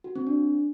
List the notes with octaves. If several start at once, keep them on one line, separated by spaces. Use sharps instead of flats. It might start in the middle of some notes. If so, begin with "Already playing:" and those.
F#4
C4
D4